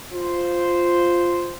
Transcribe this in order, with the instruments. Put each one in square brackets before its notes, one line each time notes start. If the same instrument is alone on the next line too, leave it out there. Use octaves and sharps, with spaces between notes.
[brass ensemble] F4 C5